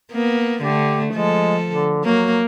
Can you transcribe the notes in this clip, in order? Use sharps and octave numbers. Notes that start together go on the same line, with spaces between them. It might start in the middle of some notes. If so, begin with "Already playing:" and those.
A#3 B3
D3 A3 G4
F3 G#3 A4
D3
F#3 A#3